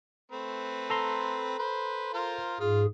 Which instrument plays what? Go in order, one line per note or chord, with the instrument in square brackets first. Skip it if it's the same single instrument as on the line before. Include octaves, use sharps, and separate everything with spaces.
[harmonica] A3 C4 B4
[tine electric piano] A4 A#5 C6
[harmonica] B4 C5
F4 A#4 C5
[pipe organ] G#2 G#4 [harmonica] F4